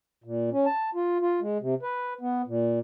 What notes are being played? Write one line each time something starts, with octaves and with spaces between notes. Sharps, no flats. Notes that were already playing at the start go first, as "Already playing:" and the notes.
A#2
C#4
A5
F4
F4
G#3
C3
B4
B3
A#2